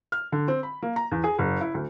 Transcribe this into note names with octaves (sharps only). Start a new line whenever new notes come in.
F6
D3
C4
B5
A#3
A#5
E2
G#4
F#1
E4
D2